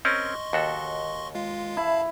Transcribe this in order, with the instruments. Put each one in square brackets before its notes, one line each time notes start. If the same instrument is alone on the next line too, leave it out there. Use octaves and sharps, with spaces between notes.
[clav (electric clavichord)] C4 C#4 A#4 [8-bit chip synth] D#5 C6 C#6
[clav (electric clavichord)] D#2 F#4 A4
[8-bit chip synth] G#3 F4 F5
[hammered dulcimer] E4 [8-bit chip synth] F5 A5 B5